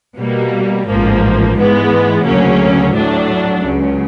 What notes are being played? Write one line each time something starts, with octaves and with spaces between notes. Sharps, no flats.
B2 G3 A#3
A1 G#2 F3 A#3
G#2 E3 G#3 B3
D2 C#3 F#3 A#3 C#4
A2 F#3 A3 D4
C#2 C#3 F#3